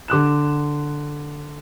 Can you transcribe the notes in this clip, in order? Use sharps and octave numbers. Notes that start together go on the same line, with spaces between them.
D3 D6 F#6 E7